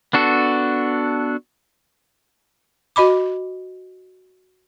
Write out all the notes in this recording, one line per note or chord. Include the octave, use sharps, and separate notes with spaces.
B3 D4 F#4 A4
F#4 D#5 B5 D6